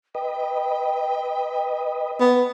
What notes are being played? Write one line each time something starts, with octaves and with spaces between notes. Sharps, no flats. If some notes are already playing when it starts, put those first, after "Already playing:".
B4 D#5 G5
B3